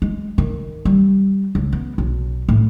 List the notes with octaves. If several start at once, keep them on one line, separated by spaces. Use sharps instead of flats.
G#3
D#3
G3
C#2
B3
B1
A2